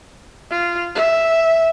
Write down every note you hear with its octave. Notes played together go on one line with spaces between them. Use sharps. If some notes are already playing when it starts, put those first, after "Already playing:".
F4
E5